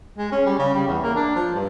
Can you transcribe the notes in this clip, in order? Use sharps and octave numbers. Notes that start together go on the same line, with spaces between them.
G#3
C#4
G3
C#3
G3
E2
A#3
D4
F3
G2